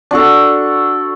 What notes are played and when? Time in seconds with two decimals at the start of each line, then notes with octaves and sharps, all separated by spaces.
0.11 D4 F#4 A4